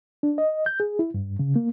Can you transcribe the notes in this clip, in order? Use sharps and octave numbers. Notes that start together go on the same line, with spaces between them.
D4
D#5
G6
G#4
E4
G2
C#3
A#3